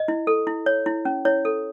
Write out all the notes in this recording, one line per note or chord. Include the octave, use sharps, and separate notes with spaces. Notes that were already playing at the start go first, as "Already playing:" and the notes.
Already playing: D#5
E4
A4
E4
C#5
E4
C#4
E4 C#5
A4